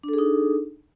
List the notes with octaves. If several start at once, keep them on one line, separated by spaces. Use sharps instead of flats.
D4 D#4 G#4 A4